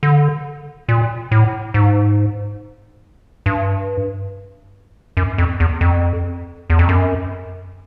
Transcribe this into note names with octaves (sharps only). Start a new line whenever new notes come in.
D3
A#2
A2
G#2
G2
F#2
F2
E2
F2
E2
F2
F#2